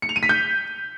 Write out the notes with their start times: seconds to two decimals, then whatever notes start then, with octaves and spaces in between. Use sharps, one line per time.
0.02 C#7
0.09 F7
0.16 D#7
0.23 B6
0.29 G6